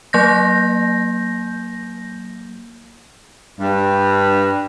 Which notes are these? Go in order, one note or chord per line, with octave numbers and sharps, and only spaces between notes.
F#3 A#3 G6 A#6
G2